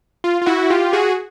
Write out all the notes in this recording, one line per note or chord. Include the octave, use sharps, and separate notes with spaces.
F4
F4
E4 F#4
F4 G4
F#4 G#4